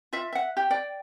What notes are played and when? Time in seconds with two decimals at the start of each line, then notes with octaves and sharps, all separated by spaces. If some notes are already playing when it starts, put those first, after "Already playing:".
0.13 F4 E5
0.32 E5 F#5
0.57 G4
0.71 D5 G5